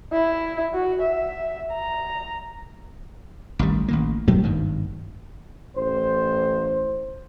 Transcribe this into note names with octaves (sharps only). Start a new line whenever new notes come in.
E4
F#4
E5
A#5
A1 D#3 G3
A1 D#3 A#3
B2 F#3 A3 A#3
G#1 G2 D#3
A1 C5